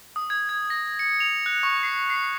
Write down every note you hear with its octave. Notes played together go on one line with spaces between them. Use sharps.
D#6
G#6
G#6
A#6
C#7
F7
F#6
C#6
C7
C7